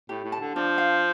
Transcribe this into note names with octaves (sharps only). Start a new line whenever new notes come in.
A2 G4
A2
A5
D3
F3 D4
F5